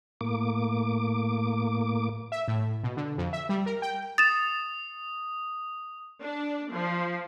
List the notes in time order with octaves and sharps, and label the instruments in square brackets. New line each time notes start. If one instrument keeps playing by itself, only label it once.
[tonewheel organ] A2 A#3 D6
[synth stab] E5
A2
B2
D3
F2
E5
G3
A#4
G5
[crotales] D#6 [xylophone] A6 E7
[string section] D4
F3